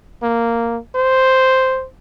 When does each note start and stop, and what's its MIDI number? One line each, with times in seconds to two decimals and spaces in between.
0.23 0.77 58
0.95 1.85 72